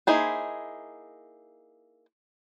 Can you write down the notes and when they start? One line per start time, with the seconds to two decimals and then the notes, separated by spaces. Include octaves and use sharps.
0.07 A#3 D#4 E4 G#4 C5